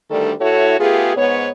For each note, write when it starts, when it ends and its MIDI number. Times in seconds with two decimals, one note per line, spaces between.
0.11 0.32 38
0.11 0.32 50
0.11 0.32 51
0.11 0.32 55
0.11 0.32 57
0.11 0.32 69
0.41 0.77 45
0.41 0.77 57
0.41 0.77 64
0.41 0.77 66
0.41 0.77 69
0.41 0.77 73
0.80 1.13 57
0.80 1.13 59
0.80 1.13 65
0.80 1.13 67
0.80 1.13 68
1.16 1.49 44
1.16 1.49 59
1.16 1.49 73